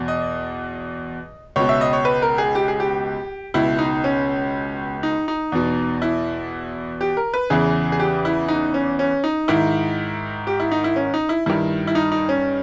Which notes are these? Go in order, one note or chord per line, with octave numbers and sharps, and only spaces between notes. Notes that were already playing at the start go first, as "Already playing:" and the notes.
Already playing: E2 B2
D#5
C#2 B2 C#5
E5
D#5
C#5
B4
A#4
G#4
G4
G#4
G4
C#2 B2 E4
D#4
C#4
D#4
D#4
E2 B2
E4
G4
A#4
B4
E2 C#3 E3 G#4
G#4
G4
E4
D#4
C#4
C#4
D#4
G#2 D#3 E4
G4
E4
D#4
E4
C#4
D#4
E4
G2 D#3 E4
E4
D#4
D#4
C#4